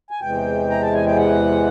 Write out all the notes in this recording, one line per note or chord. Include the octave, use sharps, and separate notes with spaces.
G#5
E2 C3 E3 G#3 G5
A#5
A5
G#5
G5
F#5